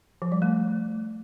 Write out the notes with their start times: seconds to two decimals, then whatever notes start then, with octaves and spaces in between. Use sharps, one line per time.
0.22 F3
0.32 G3
0.42 A3